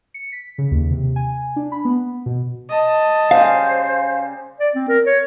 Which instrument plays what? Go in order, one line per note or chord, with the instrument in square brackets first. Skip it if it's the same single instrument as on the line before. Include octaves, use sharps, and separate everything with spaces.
[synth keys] C#7
B6
C#3
D#2
C3
G#5
D4
B5
B3
B2
[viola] D#5 A5
[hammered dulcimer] C#3 G3 [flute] C5 [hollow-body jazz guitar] F5
[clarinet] D5
C4
A#4
C#5